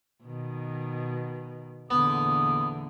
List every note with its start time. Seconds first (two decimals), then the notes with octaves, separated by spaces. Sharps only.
0.23 B2 D#3
1.91 E2 A#2 D3 B3 D#6